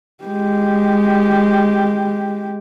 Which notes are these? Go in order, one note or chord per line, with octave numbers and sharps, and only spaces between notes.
G#3 G4